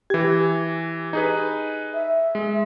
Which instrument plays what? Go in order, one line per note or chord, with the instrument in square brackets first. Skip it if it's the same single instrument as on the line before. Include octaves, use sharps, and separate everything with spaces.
[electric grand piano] E3 G#6 [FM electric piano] G4
[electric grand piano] D#4 G#4 B4
[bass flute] E5
[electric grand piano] G#3